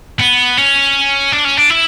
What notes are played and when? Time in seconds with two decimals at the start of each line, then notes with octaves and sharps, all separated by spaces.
0.20 B3
0.57 C#4
1.32 D4
1.45 C#4
1.57 D4
1.70 E4